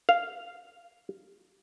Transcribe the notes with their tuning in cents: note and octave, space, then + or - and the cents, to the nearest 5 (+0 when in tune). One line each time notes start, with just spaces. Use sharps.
F5 -5